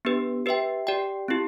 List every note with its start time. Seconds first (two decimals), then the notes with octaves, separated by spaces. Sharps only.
0.05 B3 D4 G4 B4
0.46 G4 B4 E5 G5
0.87 G4 D5 G5
1.28 C4 E4 G4